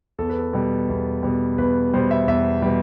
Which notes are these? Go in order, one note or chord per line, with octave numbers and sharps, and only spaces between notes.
E2 A4
B4
A4
B2 G3
E2
B2 G3
E2 B4
B2 G3 C5
E5
E2 E5
B2 G3